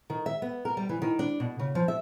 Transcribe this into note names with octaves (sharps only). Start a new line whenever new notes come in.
D#3
E5
B3
A#4
G3
E3
D#3
D4
B2
C#3
F3
E5